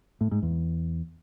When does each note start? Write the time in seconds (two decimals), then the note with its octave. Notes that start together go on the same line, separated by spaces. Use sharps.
0.21 A2
0.32 G#2
0.42 E2